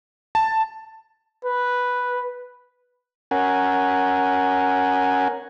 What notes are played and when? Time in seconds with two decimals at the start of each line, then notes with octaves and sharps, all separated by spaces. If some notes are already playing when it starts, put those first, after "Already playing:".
0.35 A5
1.45 B4
3.31 C#4 A#4 F#5 G#5